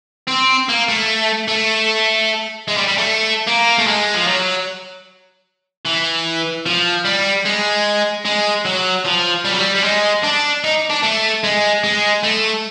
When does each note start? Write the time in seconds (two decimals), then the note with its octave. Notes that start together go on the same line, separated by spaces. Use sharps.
0.28 C4
0.69 A#3
0.89 A3
1.48 A3
2.68 G#3
2.77 G3
2.88 G3
2.98 A3
3.47 A#3
3.79 A3
3.87 G#3
4.14 F3
4.27 F#3
5.85 E3
6.66 F3
7.05 G3
7.45 G#3
8.25 G#3
8.65 F#3
9.05 F3
9.45 G3
9.51 F#3
9.59 G3
9.75 G3
9.84 G#3
10.24 D4
10.64 D#4
10.90 D4
11.03 A3
11.44 G#3
11.84 G#3
12.24 A3